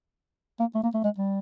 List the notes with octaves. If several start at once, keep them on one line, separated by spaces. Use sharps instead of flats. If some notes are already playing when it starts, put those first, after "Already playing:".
A#3
A3
A#3
A3
G#3
G3